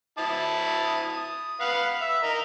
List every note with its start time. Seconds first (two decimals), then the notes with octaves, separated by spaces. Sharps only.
0.18 E4 A5 D#6
1.09 D#6
1.61 B4 F5 F#5
2.01 E5
2.23 A#4 D#5